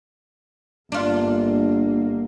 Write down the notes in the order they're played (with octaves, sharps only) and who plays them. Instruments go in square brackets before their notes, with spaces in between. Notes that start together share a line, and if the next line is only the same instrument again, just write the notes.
[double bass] G1 A#3 [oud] D4 F4